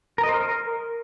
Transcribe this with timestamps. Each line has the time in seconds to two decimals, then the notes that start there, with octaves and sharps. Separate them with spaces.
0.18 A#4
0.23 D#5
0.29 C5
0.34 A#4